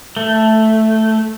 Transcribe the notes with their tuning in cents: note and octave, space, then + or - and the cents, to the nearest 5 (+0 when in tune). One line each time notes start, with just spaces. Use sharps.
A3 +0